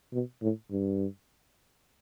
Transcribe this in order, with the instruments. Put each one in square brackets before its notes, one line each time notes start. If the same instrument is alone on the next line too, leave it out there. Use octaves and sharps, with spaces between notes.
[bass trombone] B2
A2
G2